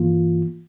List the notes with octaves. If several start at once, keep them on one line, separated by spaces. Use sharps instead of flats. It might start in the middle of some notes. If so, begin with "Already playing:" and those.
Already playing: G2 E3 A#3 F4